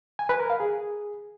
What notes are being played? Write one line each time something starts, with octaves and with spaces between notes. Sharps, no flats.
G#5
B4
A#4
F5
G#4